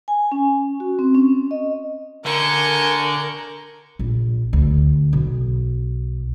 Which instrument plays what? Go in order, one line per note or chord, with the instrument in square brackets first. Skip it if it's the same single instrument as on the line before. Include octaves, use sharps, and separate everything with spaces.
[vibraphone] G#5
C#4
F#4
C4
C#4
D#5
[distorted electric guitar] D3 [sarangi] A#4 [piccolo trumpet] G#5 [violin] C#6 G6
[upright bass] A#1
D2
B1